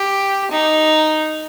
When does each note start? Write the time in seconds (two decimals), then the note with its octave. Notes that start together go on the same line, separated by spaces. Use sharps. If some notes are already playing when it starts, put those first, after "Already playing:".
Already playing: G4
0.51 D#4